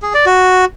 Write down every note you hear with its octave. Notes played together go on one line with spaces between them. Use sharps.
G#4
D5
F#4